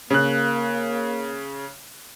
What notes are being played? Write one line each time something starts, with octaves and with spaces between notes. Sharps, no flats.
C#3 A#3 F#6